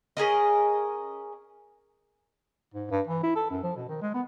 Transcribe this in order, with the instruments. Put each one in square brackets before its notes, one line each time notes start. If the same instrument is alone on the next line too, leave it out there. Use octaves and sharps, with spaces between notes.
[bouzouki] C#4 G#4 A#4 D#5
[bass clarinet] G#2
G2
E3
E4
A4
F#2
F3
B2
D#3
G#3
B3